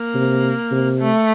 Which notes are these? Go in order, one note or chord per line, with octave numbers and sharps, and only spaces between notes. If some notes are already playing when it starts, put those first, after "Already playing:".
Already playing: A#3
C3
C3
A3